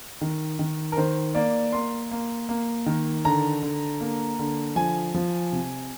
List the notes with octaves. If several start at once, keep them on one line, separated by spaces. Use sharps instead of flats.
D#3
D#3
A#4
D#3 C5
A#3 D5
A#3 C6
A#3
A#3
D#3
D3 A#5
D3
A#3
D3
F3 G#5
F3
C3